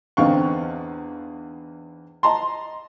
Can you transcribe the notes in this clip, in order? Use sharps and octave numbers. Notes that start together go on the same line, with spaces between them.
E2 D3 C4 D#4 F5 C#6
D#5 A5 A#5 C6